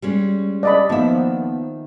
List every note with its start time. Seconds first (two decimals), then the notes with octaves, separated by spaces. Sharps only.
0.02 G3 G#3 C#4
0.63 D5 D#5 B5
0.89 D#3 F3 A#3 B3 E5